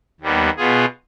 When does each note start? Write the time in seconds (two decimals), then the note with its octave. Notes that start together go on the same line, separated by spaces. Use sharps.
0.21 D#2 D#3 G3 B3
0.57 B2 B3 F4 G#4